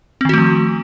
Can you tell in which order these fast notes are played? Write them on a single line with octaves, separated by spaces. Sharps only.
C4 D#3 F#4 A3 F3